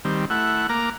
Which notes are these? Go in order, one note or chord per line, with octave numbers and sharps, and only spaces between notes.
D#3 G3 C4
A3 E4 F#5
A#3 A#5 D6 F6